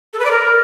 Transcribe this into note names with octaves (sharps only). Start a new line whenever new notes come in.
A4
B4
D5
A#4